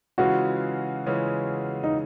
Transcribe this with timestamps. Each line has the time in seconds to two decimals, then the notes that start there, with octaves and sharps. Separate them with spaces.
0.18 C#3 E3 G#3 C#4 F4 F#4
1.06 C#3 E3 G#3 C#4 F4
1.84 D#4